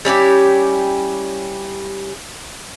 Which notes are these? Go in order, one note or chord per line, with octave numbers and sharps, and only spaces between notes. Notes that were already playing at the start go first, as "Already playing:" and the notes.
G3 C#4 E4 G4